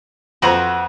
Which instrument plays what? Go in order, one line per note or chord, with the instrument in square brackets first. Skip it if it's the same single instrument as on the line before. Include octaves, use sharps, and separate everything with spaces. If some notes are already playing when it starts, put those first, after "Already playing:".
[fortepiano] F2 C5 A#5 [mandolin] F#4 B4